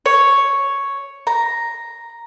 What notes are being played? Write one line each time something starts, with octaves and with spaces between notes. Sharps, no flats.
C#5
A#5